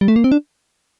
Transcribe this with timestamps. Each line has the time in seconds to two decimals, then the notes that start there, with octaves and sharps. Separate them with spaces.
0.01 G3
0.08 A3
0.16 A#3
0.24 C4
0.32 D4